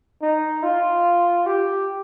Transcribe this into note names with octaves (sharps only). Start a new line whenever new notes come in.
D#4
F4
G4